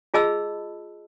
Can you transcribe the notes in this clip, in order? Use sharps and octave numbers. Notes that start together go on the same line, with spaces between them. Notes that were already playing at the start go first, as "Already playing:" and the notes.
F4 G#4 D#5 A5 B5 E6